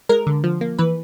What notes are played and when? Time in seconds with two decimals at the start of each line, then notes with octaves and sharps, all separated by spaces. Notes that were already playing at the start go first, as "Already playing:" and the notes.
0.09 G#3 A#4
0.27 D3
0.44 F3
0.61 A#3
0.79 E3 B4